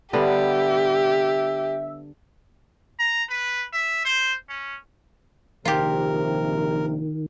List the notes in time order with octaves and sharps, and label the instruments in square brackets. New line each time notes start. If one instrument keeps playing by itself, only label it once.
[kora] D3 G3 B3 [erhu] G4 [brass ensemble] E5
[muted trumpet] A#5
B4
E5
C5
C#4
[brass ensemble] A#1 C3 [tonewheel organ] D#3 [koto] F4 G4 [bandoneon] A#4